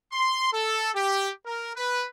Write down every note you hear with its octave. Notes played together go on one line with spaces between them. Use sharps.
C6
A4
G4
A#4
B4